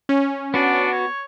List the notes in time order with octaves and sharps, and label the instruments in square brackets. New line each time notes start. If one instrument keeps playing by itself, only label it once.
[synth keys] C#4
[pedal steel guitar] B3 F#4 [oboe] D4
[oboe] C#5